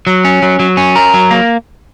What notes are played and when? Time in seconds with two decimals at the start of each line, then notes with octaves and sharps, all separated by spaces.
0.07 F#3
0.25 C#4
0.42 F#3
0.60 F#3
0.77 C#4
0.96 A#4
1.14 F#3
1.31 A#3